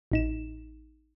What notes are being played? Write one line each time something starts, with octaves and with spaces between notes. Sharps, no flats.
A1 D#4 E7